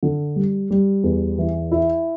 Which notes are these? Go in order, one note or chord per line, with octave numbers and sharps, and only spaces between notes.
D3
G3
G3
E2
E3
E4